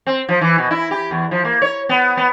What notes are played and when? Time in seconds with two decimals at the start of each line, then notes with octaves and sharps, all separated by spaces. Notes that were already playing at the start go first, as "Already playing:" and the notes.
0.07 C4
0.29 F3
0.41 E3
0.58 B2
0.71 E4
0.91 G4
1.11 E2
1.31 F3
1.45 A#3
1.62 C#5
1.89 B3
2.17 B3